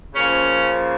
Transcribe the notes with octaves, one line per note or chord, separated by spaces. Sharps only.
C#3 F3 A#3 C#4